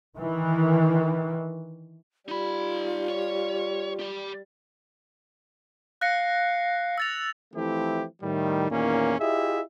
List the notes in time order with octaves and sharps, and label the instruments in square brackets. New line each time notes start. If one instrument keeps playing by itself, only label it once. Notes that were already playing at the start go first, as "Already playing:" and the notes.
[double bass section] D#3 E3
[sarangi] G3 [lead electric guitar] D#4 B5 [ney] F4
[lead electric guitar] C#5
G4 D5
[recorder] F5 [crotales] F#6 A#6 C#7
[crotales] E6 A6 F7
[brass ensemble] E3 F3 A3 C4 E4 G4
A2 D#3 G3
E2 A#2 D#3 A#3 C#4
E4 F4 G4 G#4 D#5 E5